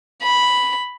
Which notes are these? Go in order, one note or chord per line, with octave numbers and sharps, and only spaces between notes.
B5